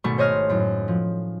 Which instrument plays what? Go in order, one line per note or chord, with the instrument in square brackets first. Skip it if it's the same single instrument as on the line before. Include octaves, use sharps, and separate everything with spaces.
[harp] G#1 B2 A3 C#6
C5 C#5 D#5 F6 C7
F#2 A2
F3